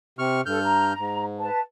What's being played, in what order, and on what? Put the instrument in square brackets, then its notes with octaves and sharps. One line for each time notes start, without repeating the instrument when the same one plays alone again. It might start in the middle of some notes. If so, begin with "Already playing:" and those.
[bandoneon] C3 C#6 F6
[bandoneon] G2 F6 G6 [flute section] A4
[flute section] A#5
[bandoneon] G#2
[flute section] B4 A5